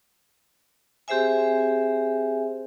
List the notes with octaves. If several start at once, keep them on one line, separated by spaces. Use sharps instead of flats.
C4 G4 G#4 C5 E5 G#5